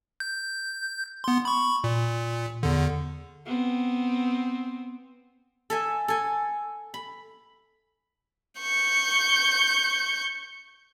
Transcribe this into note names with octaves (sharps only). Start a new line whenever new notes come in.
G6
B3 C6
B5 C#6
A#2
E2 D3
B3 C4
A4 E5 G#5
A4 G#5
B5
C#6 G6